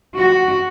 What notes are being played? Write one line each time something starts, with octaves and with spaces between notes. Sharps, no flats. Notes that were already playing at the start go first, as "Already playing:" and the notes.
F#4